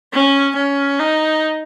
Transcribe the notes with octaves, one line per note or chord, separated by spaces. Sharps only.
C#4
C#4
D#4